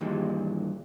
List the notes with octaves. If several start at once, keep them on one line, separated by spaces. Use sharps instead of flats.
G2 A#2 D#3 E3 G3 G#3